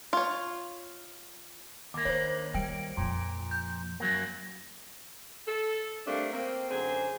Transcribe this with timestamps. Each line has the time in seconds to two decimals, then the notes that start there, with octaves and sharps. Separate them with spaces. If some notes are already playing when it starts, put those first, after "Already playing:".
0.13 F4 C#5
1.94 D#2 A#3 D6
2.05 D4 C5 C#5
2.54 G3 G5 D7
2.97 F2 A#2 F3
3.51 G6
4.00 F#2 F#3 A#3
5.47 A4
6.07 G3 A3 A#3 C4 D4
6.33 A#3 C4
6.70 F#2 D3 G#4 C5